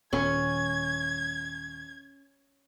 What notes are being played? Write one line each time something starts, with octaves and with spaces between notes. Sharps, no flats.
D#1 C#4 G#6